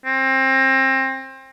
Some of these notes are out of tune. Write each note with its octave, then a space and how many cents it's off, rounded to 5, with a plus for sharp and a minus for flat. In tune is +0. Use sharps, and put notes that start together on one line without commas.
C4 +25